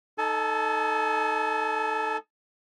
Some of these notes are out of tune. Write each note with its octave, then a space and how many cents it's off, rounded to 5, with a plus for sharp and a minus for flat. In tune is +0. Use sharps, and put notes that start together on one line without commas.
D#4 +0 A4 +0 G#5 +45